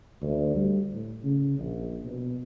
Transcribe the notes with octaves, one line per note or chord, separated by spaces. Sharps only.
D2
G3
A2
C#3
A#1
B2